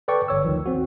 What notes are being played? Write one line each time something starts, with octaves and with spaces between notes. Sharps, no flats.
A4 B4 D5 G5 C#6
G1 C#5 E6
D2 D#3 F3
C4 F#4